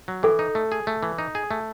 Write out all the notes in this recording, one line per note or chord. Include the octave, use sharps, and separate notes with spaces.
F#3
E3 A4
D#4
A3
G#4
A3
E3
D#4
G#4
A3